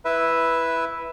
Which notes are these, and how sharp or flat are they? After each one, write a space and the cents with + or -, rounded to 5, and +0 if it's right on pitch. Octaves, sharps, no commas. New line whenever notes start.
E4 +0 B4 +0 E5 +0